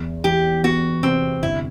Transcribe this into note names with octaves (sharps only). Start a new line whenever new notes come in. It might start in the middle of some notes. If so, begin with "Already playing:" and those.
Already playing: E2
E3 G4
B3 F#4
C3 C4
G1 E4